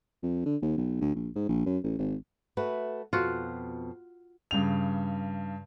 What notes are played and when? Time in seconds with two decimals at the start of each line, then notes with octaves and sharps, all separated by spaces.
0.23 F2
0.46 D3
0.62 D#2
0.77 B1
1.01 D2
1.15 A#1
1.36 G#2
1.49 A#1
1.66 F#2
1.84 A1
1.98 G#1
2.57 A3 F#4 B4
3.13 F2 B2 F4 F#4
4.51 G2 C#3 F7